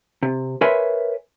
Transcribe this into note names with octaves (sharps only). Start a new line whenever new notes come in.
C3
A#4 B4 C#5 E5 G#5 C6